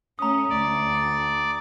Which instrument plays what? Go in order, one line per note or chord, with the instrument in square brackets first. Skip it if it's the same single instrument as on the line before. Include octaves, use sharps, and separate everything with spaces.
[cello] A3 C#4 [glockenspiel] A#5 D#6
[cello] D2 [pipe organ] D5